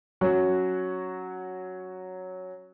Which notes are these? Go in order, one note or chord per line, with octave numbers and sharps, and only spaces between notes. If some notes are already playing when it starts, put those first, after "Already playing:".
F#3 C#4 F#4 C#5